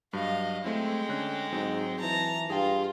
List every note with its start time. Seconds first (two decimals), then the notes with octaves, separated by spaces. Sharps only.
0.13 G2 F#3 D#5 F5
0.64 G#3 A3 C4 E4 G5
1.09 D3 C#4 F#6
1.53 G#2 F#3 C4 D#4
2.00 E3 A5 A#5
2.50 G2 F4 G#4 G5